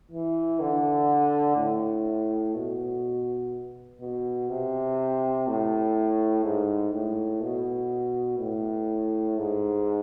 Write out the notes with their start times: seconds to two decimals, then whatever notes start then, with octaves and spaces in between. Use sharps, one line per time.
0.11 E3
0.60 D3
1.56 A2
2.55 B2
4.01 B2
4.49 C3
5.48 A2
6.44 G#2
6.93 A2
7.43 B2
8.39 A2
9.38 G#2